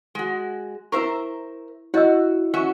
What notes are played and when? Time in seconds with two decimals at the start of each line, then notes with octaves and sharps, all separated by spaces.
0.15 G#3 F#4
0.92 E4 A#4 C5 E5 C#6
1.94 E4 F#4 C#5 D#5 E6
2.54 C#4 F#4 E5